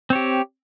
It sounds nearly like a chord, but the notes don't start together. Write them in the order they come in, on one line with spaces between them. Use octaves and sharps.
C4 C#5 G4